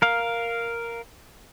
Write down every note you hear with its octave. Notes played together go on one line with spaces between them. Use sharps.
A#4 F5